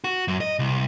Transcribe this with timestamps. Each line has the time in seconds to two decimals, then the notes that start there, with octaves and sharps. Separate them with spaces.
0.04 F#4
0.28 F#2
0.41 D#5
0.59 C2